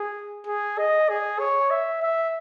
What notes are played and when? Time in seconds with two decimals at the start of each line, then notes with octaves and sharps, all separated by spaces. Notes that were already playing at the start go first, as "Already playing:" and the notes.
Already playing: G#4
0.47 G#4
0.78 D#5
1.09 G#4
1.39 C#5
1.71 E5
2.02 E5